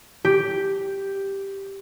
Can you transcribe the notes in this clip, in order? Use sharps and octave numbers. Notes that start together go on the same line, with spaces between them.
G4